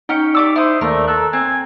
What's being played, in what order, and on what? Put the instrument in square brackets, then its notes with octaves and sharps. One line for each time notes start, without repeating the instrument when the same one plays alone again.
[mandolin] C#4 G5 [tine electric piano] D#4 C#7
[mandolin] G4 D6 E6 [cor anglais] D5
[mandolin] E4 D#6 [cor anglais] C5
[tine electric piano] D#2 A#3 D5 [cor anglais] A3 [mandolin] A#4
[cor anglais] A4 [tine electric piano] A#5 E6 F#6
[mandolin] C4 [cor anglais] G#5